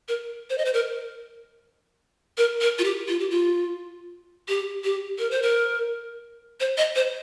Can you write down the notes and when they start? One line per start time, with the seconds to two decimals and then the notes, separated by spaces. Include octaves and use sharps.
0.08 A#4
0.50 C5
0.58 D#5
0.65 C5
0.74 A#4
2.38 A#4
2.61 A#4
2.79 F4
2.84 G4
3.08 F4
3.20 G4
3.30 F4
4.49 G4
4.84 G4
5.19 A#4
5.31 C5
5.42 A#4
6.60 C5
6.78 D#5
6.96 C5